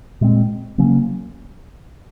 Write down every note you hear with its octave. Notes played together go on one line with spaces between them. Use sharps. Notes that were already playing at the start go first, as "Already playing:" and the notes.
A#2 G#3 C4
C#3 F#3 A#3 C#4